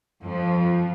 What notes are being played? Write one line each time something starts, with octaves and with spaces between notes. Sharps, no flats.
F2 F3